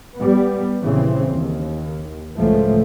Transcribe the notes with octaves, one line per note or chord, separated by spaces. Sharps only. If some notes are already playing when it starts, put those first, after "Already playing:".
G3 B3
A#1 C#3 E3 C4
D#2
C#2 A2 E3 F3 A3